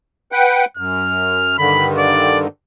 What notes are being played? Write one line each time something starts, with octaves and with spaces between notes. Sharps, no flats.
B4 F#5 G5
F#2 F6
G2 D3 D#3 B5
D5